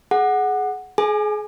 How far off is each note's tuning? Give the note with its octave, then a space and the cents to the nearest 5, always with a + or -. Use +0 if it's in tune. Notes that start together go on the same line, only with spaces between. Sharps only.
G#4 +20 F#5 +0
G#4 +30 G#5 -5